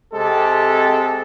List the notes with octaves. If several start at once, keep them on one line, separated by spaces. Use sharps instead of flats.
C3 G#3 C4 G4 A4